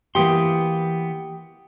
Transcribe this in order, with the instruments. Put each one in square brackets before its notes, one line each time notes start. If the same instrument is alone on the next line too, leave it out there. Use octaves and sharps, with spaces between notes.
[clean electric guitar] E3 B3 C6 [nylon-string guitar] A#3 G4 [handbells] G5 D#6